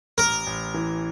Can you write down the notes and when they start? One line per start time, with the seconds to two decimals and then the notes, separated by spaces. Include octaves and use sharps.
0.18 A1 A#4
0.47 A1
0.74 E3